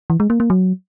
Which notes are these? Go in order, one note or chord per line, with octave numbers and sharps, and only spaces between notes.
E3
G#3
A#3
A#3
F#3